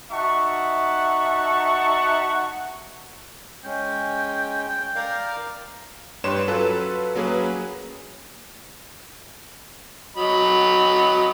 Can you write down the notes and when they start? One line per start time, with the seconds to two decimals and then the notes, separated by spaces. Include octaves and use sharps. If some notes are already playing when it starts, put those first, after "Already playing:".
0.11 D#4 F#4 E5 F#5 A5 C#6
3.64 G#3 C#4 G5
4.96 A#4 D5 F5
6.24 G2 G4 B4 C#5 C6 E7
6.48 F#3 C#4 F4 A4 B4
7.15 F#3 A#3 C#4 G#4 B4
10.17 F#3 D#5 B5